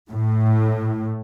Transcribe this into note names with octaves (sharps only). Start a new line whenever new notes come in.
A2